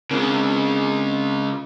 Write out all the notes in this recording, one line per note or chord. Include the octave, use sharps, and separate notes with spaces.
C#3 G#3 C4 D4 A#4